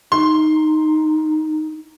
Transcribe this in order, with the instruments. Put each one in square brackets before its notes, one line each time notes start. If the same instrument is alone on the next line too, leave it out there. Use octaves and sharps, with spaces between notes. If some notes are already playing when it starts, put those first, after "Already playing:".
[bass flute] D#4 [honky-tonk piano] C6